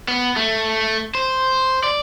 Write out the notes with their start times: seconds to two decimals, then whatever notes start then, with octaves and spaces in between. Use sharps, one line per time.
0.08 B3
0.36 A3
1.15 C5
1.83 D5